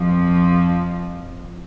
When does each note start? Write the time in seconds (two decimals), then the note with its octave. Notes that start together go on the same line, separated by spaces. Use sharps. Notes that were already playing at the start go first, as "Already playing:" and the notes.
Already playing: F2 F3